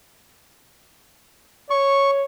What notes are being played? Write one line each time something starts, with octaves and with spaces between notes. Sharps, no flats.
C#5 C#6